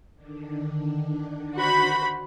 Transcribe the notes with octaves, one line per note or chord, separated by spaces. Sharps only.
D3 D#3 D4
F#4 C5 B5